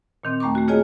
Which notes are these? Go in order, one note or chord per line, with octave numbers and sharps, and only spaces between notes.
A#2 D#3 C4
D#2 A3 A#5 C#6 D6
A3 F#4
A#3 F4 G#4 C#5 D#5 G#5